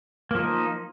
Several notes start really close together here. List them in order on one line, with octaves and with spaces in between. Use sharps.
A#3 F3 D#4